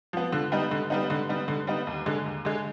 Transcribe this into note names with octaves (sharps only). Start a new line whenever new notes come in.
F3 B3
D3
G3 B3 D#4
D3
G3 B3 D#4
D3
G3 B3 D#4
D3
G3 B3 D#4
D#2
D3 G#3
D#2
D3 G#3